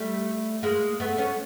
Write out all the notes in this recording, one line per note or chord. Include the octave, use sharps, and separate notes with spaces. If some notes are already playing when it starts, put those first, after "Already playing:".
Already playing: G3 A3
G#3 A#3
A3 B3
B3 C#4